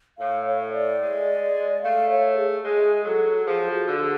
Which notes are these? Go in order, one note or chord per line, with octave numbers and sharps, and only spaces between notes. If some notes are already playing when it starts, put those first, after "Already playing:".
A2 F5
C#5
D5
G#3
A3 F5
C#5
G#4
G#3 G#4
F#3 A4
F3 G#4
F#4
D3
G#4